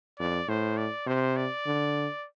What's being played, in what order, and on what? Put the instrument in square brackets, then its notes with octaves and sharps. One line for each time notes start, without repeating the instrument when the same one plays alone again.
[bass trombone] F2 [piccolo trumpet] D5
[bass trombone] A2 [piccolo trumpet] C5
[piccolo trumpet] D5
[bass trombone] C3 [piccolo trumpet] C5
[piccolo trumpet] D5
[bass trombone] D3